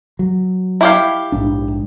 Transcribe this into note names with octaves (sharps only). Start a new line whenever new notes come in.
F#3
E4 G4 F5
A#1 G#2 D4